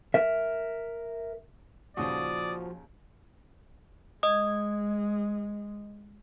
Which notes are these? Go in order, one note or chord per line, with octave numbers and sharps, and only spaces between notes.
A#4 E5
D#2 A#2 C#3 F3 F#4 D5 D#6
G#3 D#5 D#6